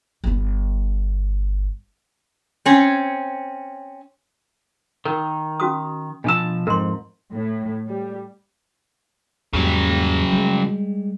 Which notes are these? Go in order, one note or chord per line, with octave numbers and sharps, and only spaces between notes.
G1 B3
C4 C#4
D#3 A#4
C#4 F#4 D#6
B2 F3 D4 A5 E6
F2 G#2 A#4 C6
A2
G3
E2 G#2 C#3 F#3 G3
G3 G#3